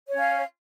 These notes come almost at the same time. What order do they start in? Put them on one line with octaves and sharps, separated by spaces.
C#5 C#4 F5